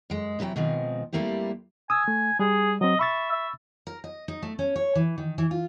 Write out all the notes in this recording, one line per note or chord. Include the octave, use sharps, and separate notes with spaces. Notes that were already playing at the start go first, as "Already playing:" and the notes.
F#2 G#3
G#2 C3 E3 F#3 G5
B2 D#3 F3 G#3 C4
G3 A3 A#3 C4 E4 G4
G#5 D#6 E6
A3
G3 G#4
F#3 C4 D#5
E5 B5 C#6 A6
E5
A#4
D#5
D#4
A3
C#4
C#5
E3
D#3
E3
F4